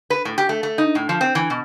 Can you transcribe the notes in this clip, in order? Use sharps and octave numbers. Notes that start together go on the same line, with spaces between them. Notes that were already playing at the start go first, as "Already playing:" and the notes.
B4
A2
G4
A3
A3
D#4
A2
F3
C4
E3
B2